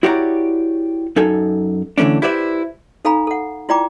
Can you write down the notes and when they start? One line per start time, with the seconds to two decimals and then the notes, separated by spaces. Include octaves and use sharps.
0.03 E4 F#4 G4 C#5 D5 A#5
1.16 F#2 D#4 A4 G#5
1.98 D3 E3 A3 C#4 D4
2.22 E4 G4 B4 C5 D5 E5
3.05 D#4 A4 F5 G#5 A#5 B5
3.27 A4 F#5
3.69 E4 F4 D5 G5 A#5 D6